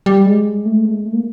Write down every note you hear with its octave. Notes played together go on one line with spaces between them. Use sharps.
G3
G#3
A3
G#3
A3
A#3